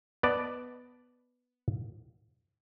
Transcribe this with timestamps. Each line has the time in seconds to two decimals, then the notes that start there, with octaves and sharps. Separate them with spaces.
0.23 B3 D5 D#5 A5